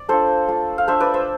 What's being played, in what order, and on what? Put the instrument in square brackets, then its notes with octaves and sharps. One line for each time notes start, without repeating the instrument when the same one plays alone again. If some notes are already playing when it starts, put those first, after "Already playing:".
Already playing: [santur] D5
A3 D4 F4 A4 C5
A3 D4 F4
F5
A3 D4 F4 C5 E5
B4 D5
C5 E5